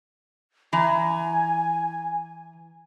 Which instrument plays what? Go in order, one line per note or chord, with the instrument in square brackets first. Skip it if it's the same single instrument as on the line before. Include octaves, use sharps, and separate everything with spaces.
[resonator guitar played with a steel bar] E3 A#5 [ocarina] G#5